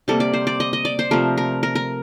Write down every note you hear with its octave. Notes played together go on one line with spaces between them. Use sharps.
C3 G3 A#3 A4
D5
C5
D5
D#5
D#5
D5
C5
C3 F3 A3 A#4
A#4
A#4
A#4